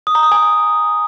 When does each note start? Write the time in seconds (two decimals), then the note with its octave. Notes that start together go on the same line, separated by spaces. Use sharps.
0.07 D#6
0.15 A#5
0.23 D#6
0.32 G#5